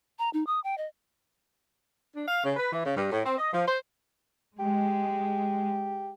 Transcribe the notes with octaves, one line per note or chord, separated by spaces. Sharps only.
A#5
D#4
D#6
G5
D#5
D4
F5
C#3
B4
E3
C#3
G2
A2
C4
D#5
F3
C5
G#3 G4